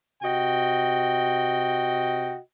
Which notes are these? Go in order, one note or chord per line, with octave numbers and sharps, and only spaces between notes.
C3 F#4 D#5 G5